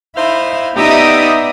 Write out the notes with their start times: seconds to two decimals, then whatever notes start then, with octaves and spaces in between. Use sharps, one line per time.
0.16 D#4 E4 C5 F5
0.77 B3 D#4 G4 D5 E5 D#6